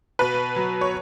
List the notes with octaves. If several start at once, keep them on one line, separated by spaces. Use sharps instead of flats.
B2 B4
F#3
C#5